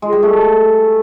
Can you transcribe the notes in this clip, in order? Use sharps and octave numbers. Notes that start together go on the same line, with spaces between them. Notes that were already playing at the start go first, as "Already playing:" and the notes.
G#3
G3
A3